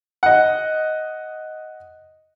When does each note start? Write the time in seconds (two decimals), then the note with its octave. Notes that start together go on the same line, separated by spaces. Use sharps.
0.23 D#5 F#5